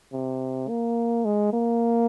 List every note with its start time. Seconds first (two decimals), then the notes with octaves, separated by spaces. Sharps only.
0.12 C3
0.68 A#3
1.25 G#3
1.53 A#3